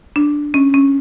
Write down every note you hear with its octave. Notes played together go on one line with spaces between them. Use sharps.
D4
C#4
C#4